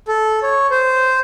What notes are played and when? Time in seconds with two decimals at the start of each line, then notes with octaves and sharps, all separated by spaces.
0.08 A4
0.43 C#5
0.71 C5